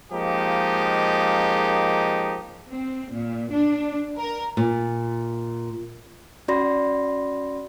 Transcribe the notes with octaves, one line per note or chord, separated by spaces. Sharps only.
F3 G#3 A#3 D#4 G4
C4
A#2
D4
A#4
A#2
C#4 F#4 D5 B5 C6 A#6